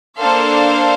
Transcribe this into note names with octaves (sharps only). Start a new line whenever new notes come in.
A#3 D4 A4 C5 F5